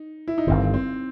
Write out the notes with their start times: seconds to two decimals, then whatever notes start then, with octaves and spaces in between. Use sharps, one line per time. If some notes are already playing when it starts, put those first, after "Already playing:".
Already playing: D#4
0.28 E4
0.38 D#4
0.47 G1 G2 D#3 C4
0.74 C4